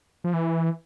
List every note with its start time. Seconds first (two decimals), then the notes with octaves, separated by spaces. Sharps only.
0.24 F3
0.34 E3